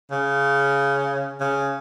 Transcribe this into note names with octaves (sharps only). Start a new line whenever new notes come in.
C#3
C#3